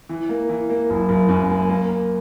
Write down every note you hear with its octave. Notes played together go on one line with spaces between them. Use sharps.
E3
A#3
E3
A#3
F#1
F#1
F#2
A#3
A#3
A#3